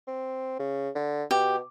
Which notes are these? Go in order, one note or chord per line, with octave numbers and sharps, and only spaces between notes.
C4
C#3
D3
B2 G4